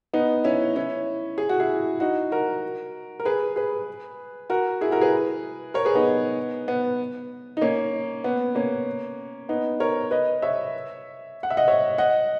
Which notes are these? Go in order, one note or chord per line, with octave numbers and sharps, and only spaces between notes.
B3 D#4
C#4 E4
C#4 E4
G#4
F#4
E4 G#4
D#4 F#4
F#4 A#4
A#4
G#4 B4
G#4 B4
F#4 A#4
E4 G#4
F#4 A#4
G#4 B4
A#4 C#5
G#4 B4
B3 D#4
B3
D#4
A#3 C#4
B3
A#3 C#4
B3 D#4
A#4 C#5
B4 D#5
C#5 E5
F#5
E5
D#5 F#5
C#5 E5
D#5 F#5